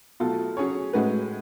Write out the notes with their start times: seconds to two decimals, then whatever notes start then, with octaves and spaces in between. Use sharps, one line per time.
0.20 B2 F#3 A3 F4 A4
0.57 F#3 C#4 G#4 C#5
0.93 A2 G#3 C#4 F#4 B4